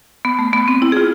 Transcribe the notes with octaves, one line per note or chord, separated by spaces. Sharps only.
B3
A3
B3
C4
E4
G#4
F4